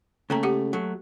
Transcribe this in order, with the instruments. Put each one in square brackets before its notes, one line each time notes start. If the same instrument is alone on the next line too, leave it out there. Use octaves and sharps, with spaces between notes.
[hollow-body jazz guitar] C#3 A3 [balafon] A#3 G5 A#5
[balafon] G4 F#5 D6
[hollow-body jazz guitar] F#3 A3